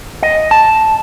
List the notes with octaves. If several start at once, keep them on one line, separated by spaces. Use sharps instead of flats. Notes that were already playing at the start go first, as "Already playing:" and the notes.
D#5
A5